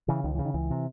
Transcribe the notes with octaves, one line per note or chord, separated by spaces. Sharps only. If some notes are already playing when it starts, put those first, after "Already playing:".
C#3 E3
C#2 D#3
C#3 E3
D#3
C#2 E3
C3